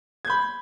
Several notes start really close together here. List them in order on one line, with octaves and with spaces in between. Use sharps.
G#6 G6 B5